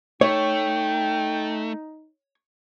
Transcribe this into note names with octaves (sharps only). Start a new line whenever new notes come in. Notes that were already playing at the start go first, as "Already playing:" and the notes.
A3 D#4 C#5 G5